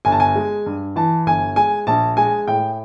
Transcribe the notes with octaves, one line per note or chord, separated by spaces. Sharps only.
G1 G#5
A5
G#5
G#3
G2
E3 A5
G1 G#5
G#3 G#5
A#1 A5
G#3 G#5
A2 G5